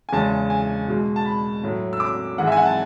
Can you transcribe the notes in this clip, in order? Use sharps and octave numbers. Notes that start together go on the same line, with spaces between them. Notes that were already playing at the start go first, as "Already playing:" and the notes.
G#5
E2 C#3 E3 G#3 A5
G#5
B2 G#3
A5
B5
A2 F#3
E6
D6
G#2 E3 G#3 F#5
E5
G#5
F#5
A5